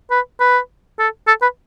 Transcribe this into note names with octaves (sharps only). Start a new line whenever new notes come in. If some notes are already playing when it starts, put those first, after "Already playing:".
B4
B4
A4
A4
B4